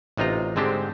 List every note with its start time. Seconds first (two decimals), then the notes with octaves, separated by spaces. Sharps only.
0.17 A1 C3 D#4 F4 A#5
0.56 G#2 D3 G#3 C4 D4 G4